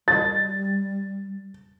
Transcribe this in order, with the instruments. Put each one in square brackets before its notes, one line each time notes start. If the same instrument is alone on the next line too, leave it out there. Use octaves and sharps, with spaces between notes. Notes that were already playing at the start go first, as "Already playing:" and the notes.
[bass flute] G3 [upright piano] A6